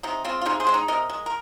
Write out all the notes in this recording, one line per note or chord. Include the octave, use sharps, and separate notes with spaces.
C3 D#4
G#3 C4 F4
F4
C3 D#4 G#4
G#4 C5
G#3 C4
D#4
C3 A#4 D#5
G#3
A#4